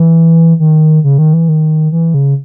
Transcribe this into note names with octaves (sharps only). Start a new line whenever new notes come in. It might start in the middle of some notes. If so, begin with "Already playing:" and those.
Already playing: E3
D#3
C#3
D#3
E3
D#3
E3
C#3